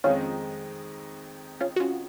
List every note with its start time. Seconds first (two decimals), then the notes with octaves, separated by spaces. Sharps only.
0.04 F2 D#3 G#3 C4 C#4 D#4 F4
1.61 C#4 F4
1.76 F#4
1.80 C#4 F4